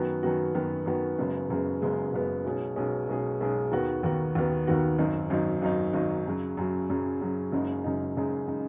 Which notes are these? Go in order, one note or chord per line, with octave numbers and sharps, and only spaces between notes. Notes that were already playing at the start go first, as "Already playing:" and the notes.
Already playing: F#2 D#3 B3 F#4
F#2 D#3 B3 F#4
F#2 D#3 B3 F#4
F#2 D#3 B3 F#4
F#1 F#2 C#3 G#3 B3
F#1 F#2 C#3 G#3 B3
F#1 F#2 C#3 G#3 B3
F#1 F#2 C#3 G#3 B3
B1 B2 G#3 C#4 G#4
B1 B2 G#3 C#4 G#4
B1 B2 G#3 C#4 G#4
B1 B2 G#3 C#4 G#4
D#2 D#3 B3 F#4
D#2 D#3 B3 F#4
D#2 D#3 B3 F#4
D#2 D#3 B3 F#4
G#1 F#2 F#3 D#4
G#1 F#2 F#3 D#4
G#1 F#2 F#3 D#4
G#1 F#2 F#3 D#4
F#2 C#3 F#3
F#2 C#3 F#3
F#2 C#3 F#3
F#2 C#3 F#3
F#1 F#2 C#3 G#3 D#4
F#1 F#2 C#3 G#3 D#4
F#1 F#2 C#3 G#3 D#4
C#3 G#3 D#4